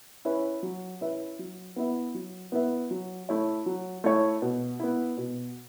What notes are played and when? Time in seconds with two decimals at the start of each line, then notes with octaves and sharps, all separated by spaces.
0.25 C#4 E4 B4 E5
0.63 F#3
1.01 C#4 E4 B4 E5
1.39 F#3
1.76 B3 E4 B4 E5
2.15 F#3
2.52 B3 E4 B4 E5
2.91 F#3
3.29 A3 E4 C#5
3.66 F#3
4.04 A3 E4 C#5
4.42 B2
4.80 B3 E4
5.18 B2